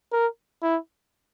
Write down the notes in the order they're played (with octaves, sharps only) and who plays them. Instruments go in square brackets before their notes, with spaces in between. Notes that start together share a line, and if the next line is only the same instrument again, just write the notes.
[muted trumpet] A#4
E4